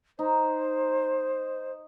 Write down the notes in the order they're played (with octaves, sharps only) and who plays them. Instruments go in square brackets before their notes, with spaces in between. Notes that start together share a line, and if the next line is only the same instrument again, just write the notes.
[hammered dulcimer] D#4 [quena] C5